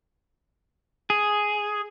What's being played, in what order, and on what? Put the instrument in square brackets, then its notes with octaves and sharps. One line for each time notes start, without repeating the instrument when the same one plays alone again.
[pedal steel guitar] G#4